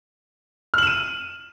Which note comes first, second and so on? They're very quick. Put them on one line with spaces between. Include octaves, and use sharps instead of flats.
F6 F#7 E7 D#7